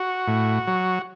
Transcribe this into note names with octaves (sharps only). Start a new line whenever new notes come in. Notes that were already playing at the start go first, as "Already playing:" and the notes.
Already playing: F#4
A2
F#3